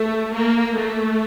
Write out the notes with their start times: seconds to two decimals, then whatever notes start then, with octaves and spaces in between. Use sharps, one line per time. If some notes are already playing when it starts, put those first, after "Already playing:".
Already playing: A3
0.32 A#3
0.74 A3